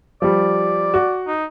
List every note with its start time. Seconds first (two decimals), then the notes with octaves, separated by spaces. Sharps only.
0.22 F3 G3 D5
0.94 F#4
1.28 D#4